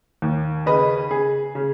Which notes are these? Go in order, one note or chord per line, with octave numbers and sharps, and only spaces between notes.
D#2
C#3 B4 D#5
C#3 G#4
C#3